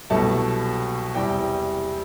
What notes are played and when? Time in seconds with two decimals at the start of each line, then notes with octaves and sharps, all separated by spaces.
0.10 C2 B2 F#3 A3 A5
1.15 E2 C3 G3 G5